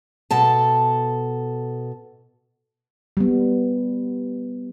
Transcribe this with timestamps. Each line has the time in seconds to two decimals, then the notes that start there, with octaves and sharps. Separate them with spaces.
0.31 B2 A4 A5
3.17 G3 B3